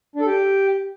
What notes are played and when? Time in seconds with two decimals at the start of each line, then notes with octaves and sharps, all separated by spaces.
0.16 D4
0.21 A4
0.26 G4